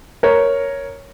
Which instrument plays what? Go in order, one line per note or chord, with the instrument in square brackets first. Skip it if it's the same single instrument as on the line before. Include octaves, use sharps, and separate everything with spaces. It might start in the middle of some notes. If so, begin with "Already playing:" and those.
[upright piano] A#4 C#5